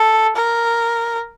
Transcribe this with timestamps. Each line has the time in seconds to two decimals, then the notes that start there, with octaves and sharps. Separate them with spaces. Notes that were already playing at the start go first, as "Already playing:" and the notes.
Already playing: A4
0.36 A#4